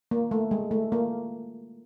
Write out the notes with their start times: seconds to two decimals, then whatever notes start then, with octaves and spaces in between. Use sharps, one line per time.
0.11 A#3
0.31 A3
0.51 G#3
0.71 A3
0.92 A#3